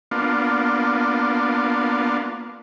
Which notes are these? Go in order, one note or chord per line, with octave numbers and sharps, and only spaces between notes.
A#3 B3 D4 F4